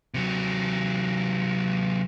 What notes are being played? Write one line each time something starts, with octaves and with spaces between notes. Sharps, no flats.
C3 F#3